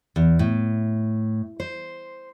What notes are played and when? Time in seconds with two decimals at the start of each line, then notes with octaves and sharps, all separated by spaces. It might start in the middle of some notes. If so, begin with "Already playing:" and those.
0.16 E2
0.39 A2
1.60 C5